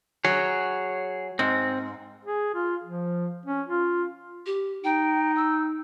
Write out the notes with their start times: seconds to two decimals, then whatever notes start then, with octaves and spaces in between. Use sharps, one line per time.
0.25 F#3 G#4 C#5
1.39 G#2 C4
2.25 G#4
2.54 F4
2.84 F3
3.46 C#4
3.68 F4
4.46 G4
4.84 D#4 G5
5.36 E6